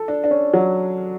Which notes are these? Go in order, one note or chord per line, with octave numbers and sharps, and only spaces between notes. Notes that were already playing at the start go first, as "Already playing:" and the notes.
Already playing: A4
D4
D4
C#4
F#3